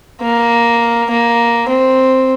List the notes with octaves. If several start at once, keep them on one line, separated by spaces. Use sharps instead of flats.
A#3
A#3
C4